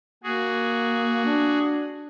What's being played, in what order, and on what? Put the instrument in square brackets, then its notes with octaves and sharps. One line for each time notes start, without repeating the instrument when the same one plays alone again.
[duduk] A#3 [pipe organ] F#4 G#4
[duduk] D4